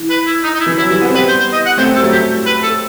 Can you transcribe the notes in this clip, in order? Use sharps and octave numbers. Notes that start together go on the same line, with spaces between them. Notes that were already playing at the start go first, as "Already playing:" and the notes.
Already playing: E3
B4
E4
D#4
D#4
E4
E3
F#3 E4
E3 G3 E4
G3 B3
C4
G3 B3 B4
C5
C5
D#5
F#5
A3 C4 C5
G3 A4
F#3 A3
G4
B4
A4